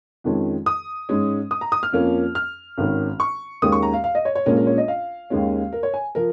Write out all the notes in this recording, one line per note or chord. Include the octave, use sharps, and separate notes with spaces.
F2 D#3 G#3 C#4
D#6
G#2 G#3 C#4
D#6
A#5
D#6
F6
F2 F3 A#3 C#4
F6
G#1 G#2 D#3 C#4
C#6
D#2 D#3 G#3 C#4 D#6
C#6
A#5
F5
F5
D#5
C#5
C#5
A#1 A#2 G#3 C#4 A#4
A#4
C#5
D#5
F5
D#2 D#3 G#3 C#4
A#4
C#5
G#5
F3 A#4